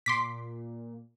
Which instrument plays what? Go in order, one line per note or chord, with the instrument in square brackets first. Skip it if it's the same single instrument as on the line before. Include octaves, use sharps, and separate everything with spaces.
[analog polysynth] A#2 [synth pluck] C6 D6 B6